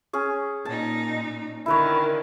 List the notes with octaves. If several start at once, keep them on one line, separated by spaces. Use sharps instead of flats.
C#4 G#4
A#2 D#4 A5
D3 D#3 E4 B4 C#5